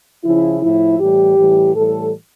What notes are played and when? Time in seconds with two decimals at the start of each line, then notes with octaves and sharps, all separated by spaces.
0.24 C#3 F3 E4
0.62 A2 F3 E4
0.99 A2 E3 G3 G4
1.37 A2 E3 G3
1.75 A2 E3 G3 A4